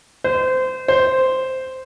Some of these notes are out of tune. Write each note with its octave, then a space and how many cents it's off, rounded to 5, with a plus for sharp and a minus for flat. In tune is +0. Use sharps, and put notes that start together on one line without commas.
C5 -25
C5 -5